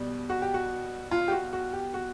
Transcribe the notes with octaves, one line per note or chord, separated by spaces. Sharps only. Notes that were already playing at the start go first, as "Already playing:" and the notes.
Already playing: B2 G3
F#4
G4
F#4
F4
G4
F#4
F#4
G4
F#4